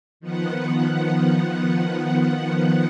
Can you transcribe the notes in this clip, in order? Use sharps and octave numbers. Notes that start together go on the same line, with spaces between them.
D#3 F3 B3 F#5